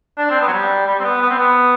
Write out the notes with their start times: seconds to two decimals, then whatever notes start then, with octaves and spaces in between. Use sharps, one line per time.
0.18 D4
0.30 C4
0.41 B3
0.47 F#3
0.52 G3
0.87 G3
1.00 C4
1.04 B3
1.21 B3
1.30 C4
1.38 B3